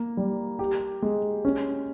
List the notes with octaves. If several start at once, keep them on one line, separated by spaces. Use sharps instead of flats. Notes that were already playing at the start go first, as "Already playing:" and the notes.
Already playing: A#3
G3
G4
G#3
C#4